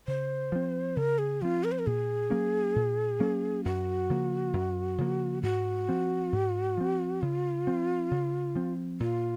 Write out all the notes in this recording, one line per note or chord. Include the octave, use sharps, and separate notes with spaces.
C#3 C5
F3 C4
C#3 A#4
G#4
F3 C4 F4
A#4
C5
A#4
A#2 G#4
F#3 A#3 C#4
A#2
F#3 A#3 C#4
F#2 F#4
C#3 F3 A#3
F#2
C#3 F3 A#3
G#2 F#4
F3 C4
G#2
F3 C4
C#3 F4
F3 C4
C#3
F3 C4
A#2 F4